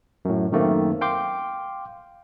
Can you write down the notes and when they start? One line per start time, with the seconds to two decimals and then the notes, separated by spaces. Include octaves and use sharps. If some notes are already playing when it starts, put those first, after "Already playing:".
0.25 F#2 A2
0.52 F#2 D#3 A3 A#3 C4
1.01 F5 G5 C6 D6